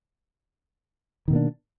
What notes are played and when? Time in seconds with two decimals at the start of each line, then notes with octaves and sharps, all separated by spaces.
1.28 D#3
1.30 B2
1.33 A#3
1.36 D4